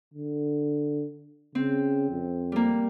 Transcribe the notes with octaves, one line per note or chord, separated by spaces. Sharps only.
D3
C#3 C4
F2
G3 A#3